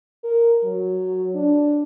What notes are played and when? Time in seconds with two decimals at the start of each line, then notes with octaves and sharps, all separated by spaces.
0.24 A#4
0.64 F#3
1.35 D4